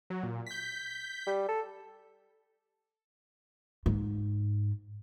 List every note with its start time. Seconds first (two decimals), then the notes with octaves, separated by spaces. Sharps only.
0.10 F#3
0.23 A#2
0.47 G6 B6
1.27 G3
1.49 A4
3.86 G#2